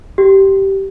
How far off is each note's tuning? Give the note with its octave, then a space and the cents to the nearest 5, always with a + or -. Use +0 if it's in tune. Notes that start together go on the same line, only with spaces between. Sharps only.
G4 -15